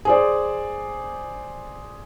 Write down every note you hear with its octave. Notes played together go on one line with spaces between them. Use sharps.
G#4 C5 D5